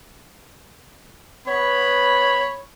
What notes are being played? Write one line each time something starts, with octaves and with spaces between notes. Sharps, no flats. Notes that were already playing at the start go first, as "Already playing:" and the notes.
B3 C#5 B5